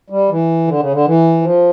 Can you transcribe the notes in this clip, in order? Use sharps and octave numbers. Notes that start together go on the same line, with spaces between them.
G3
E3
D3
C#3
D3
E3
F3